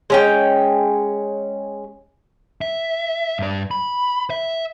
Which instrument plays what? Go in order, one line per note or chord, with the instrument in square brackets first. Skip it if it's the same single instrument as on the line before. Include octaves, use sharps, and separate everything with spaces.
[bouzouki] G#3 C#4 G5
[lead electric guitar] E5
G2 D5
B5
E5